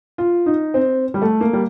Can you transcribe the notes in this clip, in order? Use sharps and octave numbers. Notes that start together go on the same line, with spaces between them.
F4
D#4
C4
G3
A3
A#3
G3